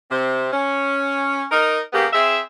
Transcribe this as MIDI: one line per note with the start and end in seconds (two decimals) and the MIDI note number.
0.10 0.50 48
0.10 0.50 60
0.52 1.43 61
1.51 1.78 63
1.51 1.78 70
1.92 2.06 49
1.92 2.06 58
1.92 2.06 59
1.92 2.06 67
2.13 2.38 60
2.13 2.38 68
2.13 2.38 76